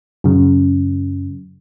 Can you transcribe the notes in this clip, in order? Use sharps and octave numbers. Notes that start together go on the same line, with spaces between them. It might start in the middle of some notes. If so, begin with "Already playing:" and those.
F#2 C#3